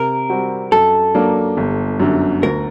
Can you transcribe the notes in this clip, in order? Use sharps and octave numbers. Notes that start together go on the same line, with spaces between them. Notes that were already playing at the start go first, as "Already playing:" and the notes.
Already playing: C3 A#4
G3 C4 F#4
F#2 A4
F#3 A#3 D4
G1
F#2 D3
D2 A#4